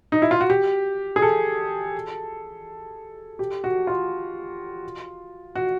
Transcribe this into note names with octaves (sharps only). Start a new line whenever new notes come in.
D#4
E4
F4
F#4
G4
G#4
A4
G4
F#4
F4
F#4